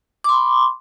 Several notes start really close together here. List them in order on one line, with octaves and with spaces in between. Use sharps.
D6 C6 B5